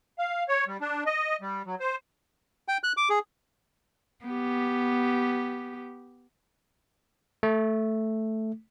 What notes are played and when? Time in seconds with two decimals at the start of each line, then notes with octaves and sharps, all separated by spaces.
0.18 F5
0.48 C#5
0.67 G3
0.81 D4
1.06 D#5
1.41 G3
1.66 F#3
1.80 C5
2.68 G5
2.84 F#6
2.97 D6
3.10 G#4
4.25 B3 G4
7.43 A3